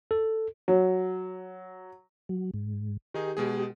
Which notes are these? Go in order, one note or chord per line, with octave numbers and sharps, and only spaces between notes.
A4
F#3
F#3
G#2
D#3 D#4 G4 G#4
B2 G#3 G#4